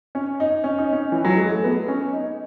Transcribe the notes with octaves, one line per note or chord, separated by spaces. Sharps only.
C#4
D#4
C#4
D#4
C#4
E3
F#3
G#3
A3
B3
C#4
D#4